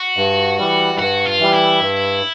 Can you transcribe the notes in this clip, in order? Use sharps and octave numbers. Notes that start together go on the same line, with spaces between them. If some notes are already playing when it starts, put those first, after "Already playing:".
Already playing: F#4
G2
E3 G3
G2 F#4
F4
E3 G3
E4
G2